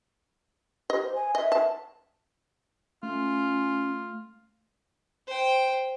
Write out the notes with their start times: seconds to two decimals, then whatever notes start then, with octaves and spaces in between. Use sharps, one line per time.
0.90 G4 D#5
1.03 C5
1.15 G#5
1.35 D#5 E5
1.52 A5
3.03 A3 C#4 F4
5.28 C5 G5